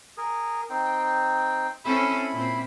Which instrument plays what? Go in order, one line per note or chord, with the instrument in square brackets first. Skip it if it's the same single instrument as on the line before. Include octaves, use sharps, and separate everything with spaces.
[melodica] G#4 A#4
C4 D#4 G5
[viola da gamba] C4 C#4 A4 [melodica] E4 B5
[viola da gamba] A#2 C4